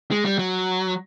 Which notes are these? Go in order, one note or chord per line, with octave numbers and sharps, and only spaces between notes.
G#3
G3
F#3